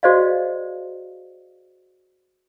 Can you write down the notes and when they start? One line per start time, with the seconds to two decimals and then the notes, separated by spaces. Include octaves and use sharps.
0.03 F#4 G#4 C5 D5 D#5 F5